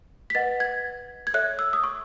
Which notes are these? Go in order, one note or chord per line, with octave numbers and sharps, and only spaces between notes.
B6
B4 D#5 F#5 A6
G#6
G#6
A4 C#5 E5 F#6
E6
D#6
C#6